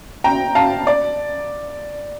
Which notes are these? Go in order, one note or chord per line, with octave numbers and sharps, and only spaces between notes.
G5 A#5
F5 A5
D5